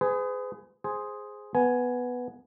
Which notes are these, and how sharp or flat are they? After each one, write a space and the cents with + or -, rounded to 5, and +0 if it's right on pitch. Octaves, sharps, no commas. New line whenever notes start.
G#4 +0 B4 +45
G#4 +0 C5 +0
B3 +0 G#5 +5